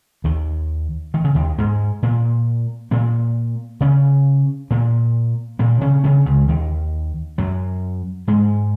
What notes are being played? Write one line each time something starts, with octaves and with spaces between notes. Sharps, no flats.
D#2 D#3
D#3
C#3
D#2 D#3
G#2 G#3
A#2 A#3
A#2 A#3
C#3 C#4
A#2 A#3
A#2 A#3
C#3 C#4
C#3 C#4
C#2 C#3
D#2 D#3
F#2 F#3
G#2 G#3